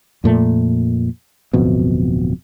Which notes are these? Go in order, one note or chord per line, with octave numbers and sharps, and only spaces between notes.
F2 A#2 A3
D1 F2 B2